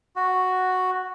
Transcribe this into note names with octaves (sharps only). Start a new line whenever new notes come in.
F#4